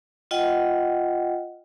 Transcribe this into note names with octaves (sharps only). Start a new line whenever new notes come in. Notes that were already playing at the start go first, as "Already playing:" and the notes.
F4 D#5 F#5 G5